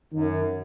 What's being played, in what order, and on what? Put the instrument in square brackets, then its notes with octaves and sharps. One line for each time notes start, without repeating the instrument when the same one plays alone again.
[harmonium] F#2 [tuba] D#3